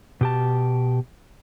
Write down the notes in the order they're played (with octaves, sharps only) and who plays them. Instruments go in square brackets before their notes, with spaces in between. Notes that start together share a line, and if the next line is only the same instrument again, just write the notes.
[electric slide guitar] B2 G4 A5